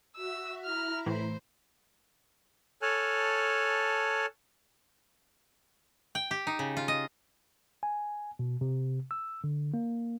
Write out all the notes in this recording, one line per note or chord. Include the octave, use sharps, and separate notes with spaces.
F#4 E5 E6
E4 A#5 B5 F6
A2 E3 C5
A4 C#5 G#5 A5 F6 F#6
G5
G4
D#4
C#3
F4
D#5
G#5
B2
C3
E6
D3
A#3